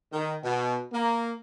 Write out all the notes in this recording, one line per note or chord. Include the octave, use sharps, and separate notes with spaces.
D#3
B2
A#3